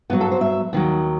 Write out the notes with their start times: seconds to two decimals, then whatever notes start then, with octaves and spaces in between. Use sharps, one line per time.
0.10 G2 B3
0.13 F#3
0.21 A4
0.31 C5
0.41 E5
0.73 D#2 D#3 F#3